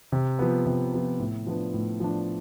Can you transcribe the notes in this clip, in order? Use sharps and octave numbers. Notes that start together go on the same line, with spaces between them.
C3
F3 B3
C3
F3 B3
A2
F3 B3 D4
A2
F3 B3 D4